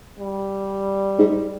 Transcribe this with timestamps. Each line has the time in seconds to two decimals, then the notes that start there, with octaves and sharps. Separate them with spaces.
0.19 G3
1.19 G#2